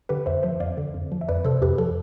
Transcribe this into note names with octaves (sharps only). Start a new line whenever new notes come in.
D3 G4 B4
F2 C5 E5
F3 C5 E5
F2 D5 F5
D3
F2
F3
E5
F2 B4 D5
C3 A4 C5
F2 G4 B4
F3 A4